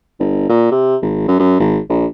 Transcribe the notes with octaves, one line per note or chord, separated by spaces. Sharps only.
G1
A#2
C3
G#1
F#2
F#2
G#1
A#1